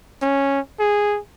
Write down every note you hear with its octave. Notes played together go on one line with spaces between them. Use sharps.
C#4
G#4